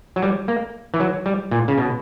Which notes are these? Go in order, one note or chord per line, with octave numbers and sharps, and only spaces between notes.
F#3
G3
A#3
E3
F#3
G3
A#2
C#3
B2